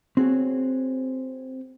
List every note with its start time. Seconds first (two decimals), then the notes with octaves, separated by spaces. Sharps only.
0.17 C4 F#4 G#4 C#5